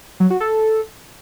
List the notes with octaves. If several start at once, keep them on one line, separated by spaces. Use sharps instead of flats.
F#3
F#4
A4